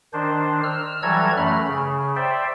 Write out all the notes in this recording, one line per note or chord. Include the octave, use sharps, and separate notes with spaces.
D#3 D4 C5
E6 F6
E3 F#3 G3 A4 A#5 G#6
F#2 E3 A3 B5 F6
C#3
C5 D5 E5 G5